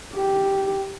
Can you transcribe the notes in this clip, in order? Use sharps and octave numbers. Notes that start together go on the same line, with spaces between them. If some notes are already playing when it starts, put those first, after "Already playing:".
G4